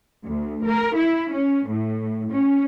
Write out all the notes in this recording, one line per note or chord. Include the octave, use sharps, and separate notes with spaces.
D2
A#4
E4
C#4
A2
C#4